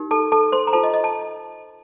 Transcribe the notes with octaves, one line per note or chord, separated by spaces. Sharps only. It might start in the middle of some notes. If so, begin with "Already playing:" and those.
Already playing: D#4 G4 A#4
A4 A5
A4 A5
C5 C6
A#5
F4 A4 C5 A5
D#5
D#5
A5